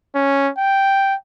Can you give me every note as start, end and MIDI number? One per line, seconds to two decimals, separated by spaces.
0.15 0.50 61
0.58 1.15 79